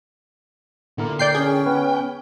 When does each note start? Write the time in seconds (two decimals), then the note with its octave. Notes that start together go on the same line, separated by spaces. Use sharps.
0.98 A#2 D3 A#3 E4 A#4
1.19 D5 G5 G6 C7
1.35 C#4 G#4
1.66 B3 B4 C#5